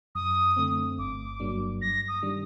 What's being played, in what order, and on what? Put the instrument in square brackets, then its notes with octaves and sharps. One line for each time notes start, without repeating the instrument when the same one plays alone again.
[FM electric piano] F#2 [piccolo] D#6
[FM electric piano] D3 A3 C4
[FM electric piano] G1 [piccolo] D6
[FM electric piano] G2 F#3 A#3 D4
[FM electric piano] G2 [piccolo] A#6
[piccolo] D#6
[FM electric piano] D#3 G3 D4